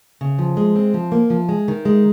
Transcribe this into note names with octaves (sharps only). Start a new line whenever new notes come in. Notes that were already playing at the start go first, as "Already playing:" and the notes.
C#3
F3
G#3
C4
F3
A#3
F3
G#3
D#3
G#3